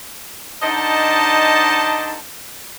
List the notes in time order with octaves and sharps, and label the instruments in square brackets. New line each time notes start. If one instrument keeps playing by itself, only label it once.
[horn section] D3 D#4 C5 D#5 A5